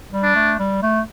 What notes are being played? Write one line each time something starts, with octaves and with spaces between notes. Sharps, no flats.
G3
D4
A3
G3
A3